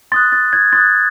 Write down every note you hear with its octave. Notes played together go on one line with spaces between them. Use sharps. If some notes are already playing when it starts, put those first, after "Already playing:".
C6 D#6 F#6 A6
A6
G#6
C6 D#6 F#6 A6